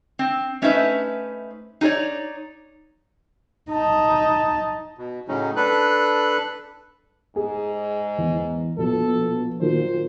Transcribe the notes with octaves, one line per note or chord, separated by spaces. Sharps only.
C4
A3 C#4 D#4 B4 C5 E5
D#4 F4 G#4 C#5 D5
D#4 A5
B2
A2 C#3 F#3 C#4 D#4
D4 A4 B4 F#6
G#2 G#4
E2
A#1 B2 A4
A#2 D#3 F#3 C5